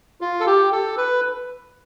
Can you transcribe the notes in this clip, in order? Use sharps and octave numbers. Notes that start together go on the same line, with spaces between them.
F4
A4
G4
A4
B4